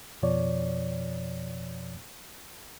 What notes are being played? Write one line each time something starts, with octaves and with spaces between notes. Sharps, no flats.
F2 B2 F3 C#5 D5